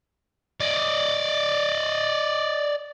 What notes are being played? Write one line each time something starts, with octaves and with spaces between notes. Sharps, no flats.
D5 D#5